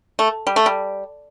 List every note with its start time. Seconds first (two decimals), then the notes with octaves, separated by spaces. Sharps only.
0.19 A3
0.47 G3
0.56 A3
0.66 G3